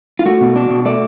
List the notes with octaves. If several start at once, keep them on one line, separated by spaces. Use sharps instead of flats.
F4
A3 F#4
B2
D4
B2
A3 D5